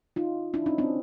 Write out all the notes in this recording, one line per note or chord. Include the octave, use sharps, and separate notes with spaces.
D#4 F4
D4 E4
C#4 D#4
C4 D4